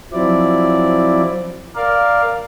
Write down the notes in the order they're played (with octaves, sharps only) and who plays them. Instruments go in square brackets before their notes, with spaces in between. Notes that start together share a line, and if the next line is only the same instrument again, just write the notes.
[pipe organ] F3 F#3 C4 E4 D5
A#4 D5 F5